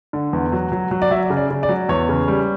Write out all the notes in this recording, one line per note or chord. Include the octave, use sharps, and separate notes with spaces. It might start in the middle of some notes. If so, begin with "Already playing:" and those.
D3
E2
F#3
F#3
F#3
D5
F#3 E5
C#3
D5
C#3
D5
F#3
E2 C#5
C#3
G3